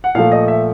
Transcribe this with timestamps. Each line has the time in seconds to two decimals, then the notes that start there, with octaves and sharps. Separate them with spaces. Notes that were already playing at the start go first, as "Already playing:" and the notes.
0.04 F#5
0.15 A#2 F3 A3 F5
0.32 D#5
0.48 E5